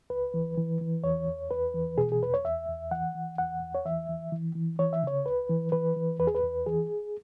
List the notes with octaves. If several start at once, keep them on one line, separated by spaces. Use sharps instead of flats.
C#2 B4
E3
E3
E3
E2 C#5
E2
E2 B4
E3
B2 G#4
G#4
E2 B4
C#5
E2 E5
E2
E3 F#5
E3
E2 F#5
E2
C#5
E3 E5
E3
E3
E3
E3 C#5
E5
C#3 C#5
C#2 B4
E3
E3 B4
E3
E2 B4
G#4
B4
E2
E3 G#4